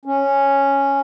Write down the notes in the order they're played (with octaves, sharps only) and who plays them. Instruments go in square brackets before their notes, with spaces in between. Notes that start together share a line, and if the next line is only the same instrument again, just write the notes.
[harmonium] C#4